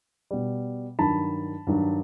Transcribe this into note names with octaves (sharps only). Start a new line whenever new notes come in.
B2 G3
G2 D#3 F#3 A5 B5
G2 D#3 F#3